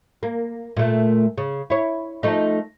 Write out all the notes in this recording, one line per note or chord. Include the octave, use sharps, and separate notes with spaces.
A#3
A#2 A3
C#3
E4 C#5
F3 A3 D#4